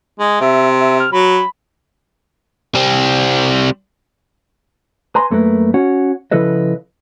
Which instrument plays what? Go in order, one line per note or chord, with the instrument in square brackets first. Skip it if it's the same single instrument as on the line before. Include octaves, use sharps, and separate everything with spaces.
[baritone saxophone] G#3
[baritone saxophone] C3 [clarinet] E5
[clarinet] E5
F6
[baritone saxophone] F#3 [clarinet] B5
[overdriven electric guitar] G3 C4
[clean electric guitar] B4 G#5 A#5 C6
F#2 A3 A#3 A#4 B4
C#4 F#4 C#5 F#5
C#3 F3 E4 A4 B4 D#5